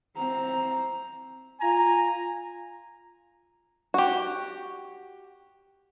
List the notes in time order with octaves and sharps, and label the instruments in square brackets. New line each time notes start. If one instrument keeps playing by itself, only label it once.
[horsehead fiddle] C4 A#5
[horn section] F4 G#5 A#5
[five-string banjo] F#4 G4